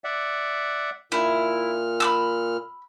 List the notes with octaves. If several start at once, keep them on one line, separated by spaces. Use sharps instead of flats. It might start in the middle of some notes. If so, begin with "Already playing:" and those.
D5 E5 F#5
A#2 E4 F6
B5 D6 E6